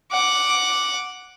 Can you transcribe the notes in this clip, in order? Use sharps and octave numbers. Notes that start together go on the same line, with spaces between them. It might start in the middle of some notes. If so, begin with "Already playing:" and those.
F#5 D6